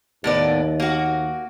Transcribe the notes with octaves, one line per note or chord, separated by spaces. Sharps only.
D#2 A2 B3 D5
A#3 F#4